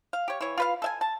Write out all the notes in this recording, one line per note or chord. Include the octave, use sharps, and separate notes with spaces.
F5
G4 C#5
E3 C#5
F4 B4 F5
A4 E5 G#5
A5